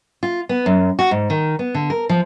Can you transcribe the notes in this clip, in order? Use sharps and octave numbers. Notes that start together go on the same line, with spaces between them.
F4
B3
F#2
F#4
G#2
D#3
B3
D3
A#4
F3